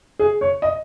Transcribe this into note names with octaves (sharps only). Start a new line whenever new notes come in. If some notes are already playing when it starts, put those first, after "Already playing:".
G#4
C#5
D#5